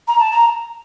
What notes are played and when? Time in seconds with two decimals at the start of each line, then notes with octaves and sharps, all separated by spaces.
0.07 A#5
0.18 A5
0.31 A#5